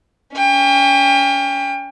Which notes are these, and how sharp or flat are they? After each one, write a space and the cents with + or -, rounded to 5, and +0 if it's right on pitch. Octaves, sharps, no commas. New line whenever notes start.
C#4 +30 G5 +35